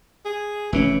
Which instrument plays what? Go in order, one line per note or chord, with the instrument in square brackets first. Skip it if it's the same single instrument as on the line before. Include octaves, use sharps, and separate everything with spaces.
[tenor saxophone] G#4
[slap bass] F1 C#3 C#4 [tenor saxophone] E3